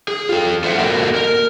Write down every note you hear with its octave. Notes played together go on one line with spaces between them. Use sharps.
G#4
F4 A4
F4 A4 C5 E5 F#5
A#3 F#4 A4 A#4 D#5 G5
A#4